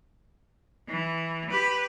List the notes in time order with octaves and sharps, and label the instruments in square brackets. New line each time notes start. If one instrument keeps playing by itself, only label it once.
[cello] E3
G4 B4